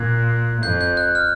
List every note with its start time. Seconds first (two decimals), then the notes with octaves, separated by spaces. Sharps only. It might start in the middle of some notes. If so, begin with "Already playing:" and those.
Already playing: A#2 F#6 G#6
0.62 F2 G6
0.81 G6
0.97 F#6
1.15 F6